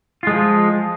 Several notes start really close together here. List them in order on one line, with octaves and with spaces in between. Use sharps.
F4 G#3 F3